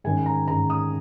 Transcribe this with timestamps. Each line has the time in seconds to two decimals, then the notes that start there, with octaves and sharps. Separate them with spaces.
0.04 G#2 D#3 C#4 G#5
0.26 A#5
0.47 G#2 D#3 C#4 A#5
0.70 D#6